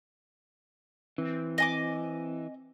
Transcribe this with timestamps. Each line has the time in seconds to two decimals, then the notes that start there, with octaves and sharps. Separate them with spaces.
1.18 E3 C4
1.58 D#5 G#5 D6